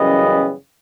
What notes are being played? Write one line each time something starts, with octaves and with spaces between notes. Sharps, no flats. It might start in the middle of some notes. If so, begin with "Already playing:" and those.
Already playing: F#2 C#3 E3 G3 B3 D#5